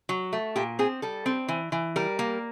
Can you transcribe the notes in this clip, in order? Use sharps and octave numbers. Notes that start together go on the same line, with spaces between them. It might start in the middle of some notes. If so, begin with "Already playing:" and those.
F#3
A3
A#2 G4
C4 G#4
G3 A4
C4
E3
E3
G3 A#4
A#3